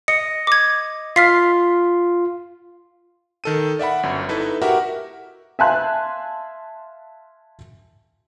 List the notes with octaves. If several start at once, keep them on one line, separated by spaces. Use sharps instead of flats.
D#5 C#7
D6 G#6
F4 F6 B6 C7
D#3 A4 D#7
D5 E5 F#5 B5
G1 F#2
D#4 E4 A4 B4
F#4 G4 A#4 E5 F#5
E5 F5 G#5 A5 C6 F#6